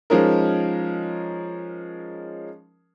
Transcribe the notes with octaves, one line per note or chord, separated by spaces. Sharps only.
F3 G#3 C#4 D#4 A#4